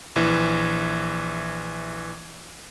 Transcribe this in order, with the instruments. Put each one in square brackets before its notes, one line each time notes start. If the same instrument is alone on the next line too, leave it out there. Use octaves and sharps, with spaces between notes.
[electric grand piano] A#1 E3